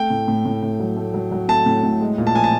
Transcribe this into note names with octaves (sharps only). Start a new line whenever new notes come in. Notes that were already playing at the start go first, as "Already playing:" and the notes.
Already playing: A3 G5
A2
A2
A2
A2
F#3
A3
F#3
F#3
A3 A5
A2
A2
G#3
A#2
A5
F3 G#5
A5